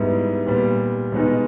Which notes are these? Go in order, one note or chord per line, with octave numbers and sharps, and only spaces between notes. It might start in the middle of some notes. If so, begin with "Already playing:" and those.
Already playing: G#2 G3 B3 E4
A#2 G3 B3
B2 G#3 B3 D#4